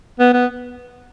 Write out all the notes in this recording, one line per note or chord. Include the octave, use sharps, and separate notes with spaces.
B3
B3